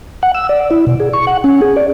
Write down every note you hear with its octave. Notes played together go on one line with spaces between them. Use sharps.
F#5
E6
D5
E4
B2
G#4
C#6
F#5
C#4
G#4
D5